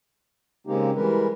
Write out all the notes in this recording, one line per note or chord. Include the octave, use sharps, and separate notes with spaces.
C#3 G#3 A#3 C4 D#4 G4
E3 G3 G#3 A#4 B4